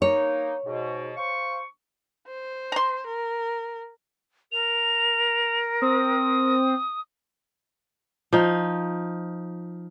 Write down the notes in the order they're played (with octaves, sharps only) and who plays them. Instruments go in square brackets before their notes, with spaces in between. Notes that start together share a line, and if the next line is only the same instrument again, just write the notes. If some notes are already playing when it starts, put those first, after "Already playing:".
[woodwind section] A#3 D#4 [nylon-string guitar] C#5
[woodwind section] G#2 B2
C5 F5 C#6
[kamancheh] C5
[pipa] A#5 C6
[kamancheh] A#4
[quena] A#4 [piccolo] F7
[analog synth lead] C4 [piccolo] D#6
[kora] F3 D#4